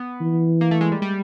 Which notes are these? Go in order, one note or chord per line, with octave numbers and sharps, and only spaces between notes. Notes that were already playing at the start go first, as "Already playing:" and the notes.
Already playing: B3
E3
A#3
A3
G#3
G3
G3